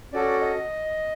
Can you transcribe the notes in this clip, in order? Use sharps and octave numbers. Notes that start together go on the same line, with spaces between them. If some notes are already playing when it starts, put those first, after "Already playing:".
C#4 F#4 A4 D5
D#5